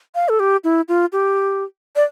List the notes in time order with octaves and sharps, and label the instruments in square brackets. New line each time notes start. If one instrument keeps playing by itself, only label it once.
[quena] F5
A4
G4
E4
F4
G4
D5